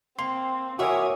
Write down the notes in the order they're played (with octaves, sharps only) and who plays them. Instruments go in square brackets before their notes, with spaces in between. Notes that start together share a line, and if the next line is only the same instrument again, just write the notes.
[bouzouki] A#3 [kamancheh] C4 [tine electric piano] C6
[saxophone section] E3 A#4 C#5 [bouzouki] A#3 E5 [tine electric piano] F#4 [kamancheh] G#5 D#6